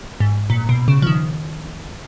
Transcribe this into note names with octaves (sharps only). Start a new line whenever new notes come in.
G#2
A#2
B2
C#3
F3
D#3